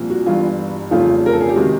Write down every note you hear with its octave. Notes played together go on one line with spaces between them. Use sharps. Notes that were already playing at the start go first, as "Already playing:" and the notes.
Already playing: C2 A#2 F3
F#4
G1 G2 E3 F4
F1 E2 C#3 F3 A3 F4
A#4
A4
G#4
G4
C3 D#3 G#3 F#4